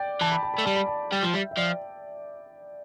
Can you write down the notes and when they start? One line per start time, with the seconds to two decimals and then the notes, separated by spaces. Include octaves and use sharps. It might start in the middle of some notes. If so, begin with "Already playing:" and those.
Already playing: D5 G5
0.21 E3 A5
0.32 B5
0.43 A5
0.54 A3 B5
0.65 G3 A5
0.76 B5
0.87 A5
1.11 G3 G5
1.23 F3
1.34 G3 E5
1.51 E5
1.57 F3 D5